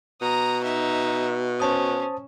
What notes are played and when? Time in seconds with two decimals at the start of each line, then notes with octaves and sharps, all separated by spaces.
0.22 B2 A#5 D#6
0.64 D#4 E5
1.60 C#4 C5 A5 D#6